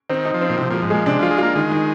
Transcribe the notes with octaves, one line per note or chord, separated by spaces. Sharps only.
D#3 C4
D#4
F3
C4
A#2
C3 F3
A#2 F3
G#2
A#2 G#3
C3 D4
F3 F4
G#3
A#3 F4
D#3 G#3
D#3